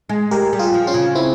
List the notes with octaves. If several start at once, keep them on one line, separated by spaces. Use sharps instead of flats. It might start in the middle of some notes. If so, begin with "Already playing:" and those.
G#3
G#3 G4 A#4
G3
F4 G#4
F3
C#4 F4
C#3
C4 E4